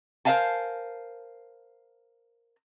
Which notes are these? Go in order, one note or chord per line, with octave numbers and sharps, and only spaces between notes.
A#4 C5 E5 F5 G#5 A5